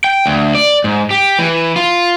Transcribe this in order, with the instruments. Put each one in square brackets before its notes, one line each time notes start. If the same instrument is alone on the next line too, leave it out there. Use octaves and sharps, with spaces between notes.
[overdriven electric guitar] G5
D2
D5
G#2
G4
E3
F4